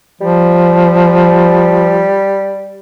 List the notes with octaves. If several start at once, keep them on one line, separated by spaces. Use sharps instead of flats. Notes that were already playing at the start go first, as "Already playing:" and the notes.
F3 G3